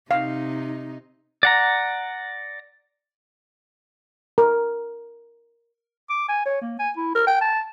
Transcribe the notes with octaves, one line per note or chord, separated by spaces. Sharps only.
C3 D#4 F5
D5 F#5 A#5
A#4
D6
G#5
C#5
A#3
G#5
E4
A#4
G5
A5